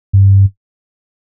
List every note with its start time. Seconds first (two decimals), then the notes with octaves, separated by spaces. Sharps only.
0.13 G2